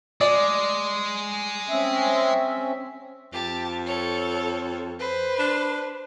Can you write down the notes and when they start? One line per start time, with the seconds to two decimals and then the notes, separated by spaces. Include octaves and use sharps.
0.21 G#3 D5
1.70 C4 C#4 E5
3.33 F2 G4 A5
3.86 A4 C#5
4.99 B4 C5
5.39 D4